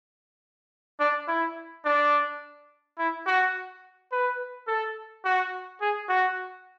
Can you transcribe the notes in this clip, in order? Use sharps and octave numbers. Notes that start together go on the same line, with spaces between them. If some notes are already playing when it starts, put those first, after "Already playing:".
D4
E4
D4
E4
F#4
B4
A4
F#4
G#4
F#4